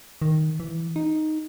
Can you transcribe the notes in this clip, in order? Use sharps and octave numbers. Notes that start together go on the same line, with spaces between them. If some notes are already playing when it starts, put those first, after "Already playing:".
D#3
E3
D#4